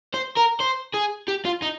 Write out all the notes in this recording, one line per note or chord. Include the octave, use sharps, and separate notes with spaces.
C5
A#4
C5
G#4
G4
F4
D#4